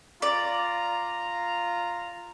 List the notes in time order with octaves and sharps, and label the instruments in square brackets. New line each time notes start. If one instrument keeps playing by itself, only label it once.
[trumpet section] F4 A#5 [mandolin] D5